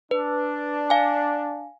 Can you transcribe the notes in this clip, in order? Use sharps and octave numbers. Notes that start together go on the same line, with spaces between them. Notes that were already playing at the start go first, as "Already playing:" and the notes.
D4 B4
F5 G#5